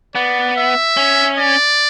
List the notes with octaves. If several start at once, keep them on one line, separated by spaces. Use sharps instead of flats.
B3 D5
E5
C#4
D5